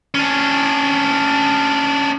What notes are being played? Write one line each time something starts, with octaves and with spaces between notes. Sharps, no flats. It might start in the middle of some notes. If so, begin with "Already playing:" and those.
C#4 D4